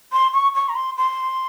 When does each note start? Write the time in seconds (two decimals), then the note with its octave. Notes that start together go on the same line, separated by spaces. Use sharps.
0.12 C6
0.33 C#6
0.55 C#6
0.69 A#5
0.75 C6
0.97 C6